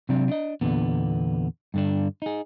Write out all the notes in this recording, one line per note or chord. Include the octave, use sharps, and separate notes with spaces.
C3 F#3 C4 D4
D4 D#5
E2 A#2 D3 B3
G2 D3 D4
D#4 G#4